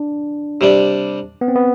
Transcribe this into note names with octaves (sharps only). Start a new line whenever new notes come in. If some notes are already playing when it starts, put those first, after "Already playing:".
Already playing: D4
C3 G3 D4
B3
C4
B3